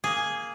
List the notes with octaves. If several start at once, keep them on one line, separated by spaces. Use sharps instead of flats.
A#3 G#4